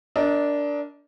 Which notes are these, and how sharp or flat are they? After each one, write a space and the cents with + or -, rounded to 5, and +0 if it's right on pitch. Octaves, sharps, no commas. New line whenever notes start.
D4 -10 A#4 +0 D#5 +25